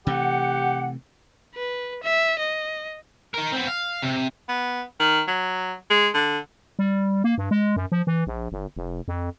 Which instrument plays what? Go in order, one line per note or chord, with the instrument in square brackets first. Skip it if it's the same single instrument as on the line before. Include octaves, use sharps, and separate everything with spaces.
[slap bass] C3 E3 A3 [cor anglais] G4 [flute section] F#5
[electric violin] B4
E5
D#5
[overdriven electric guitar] D#4 A#4
B3 C4
F5
C3
[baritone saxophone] B3
D#3
F#3
G#3
D3
[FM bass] G3
A#3
G2
G#3
F#2
F3
E3
A#1
G1
F1
F2